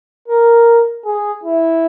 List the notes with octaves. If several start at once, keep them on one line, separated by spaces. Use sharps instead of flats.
A#4
G#4
E4